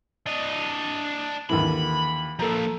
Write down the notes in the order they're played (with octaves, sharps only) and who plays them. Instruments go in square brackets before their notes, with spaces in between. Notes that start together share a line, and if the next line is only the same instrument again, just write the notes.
[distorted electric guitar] D4 D#5
[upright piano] D#2 D3 E3 [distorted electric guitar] B5
[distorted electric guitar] F3 A#3 [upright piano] A4 A#5